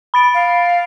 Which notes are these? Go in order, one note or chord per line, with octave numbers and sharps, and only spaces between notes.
B5 A6 D7
F5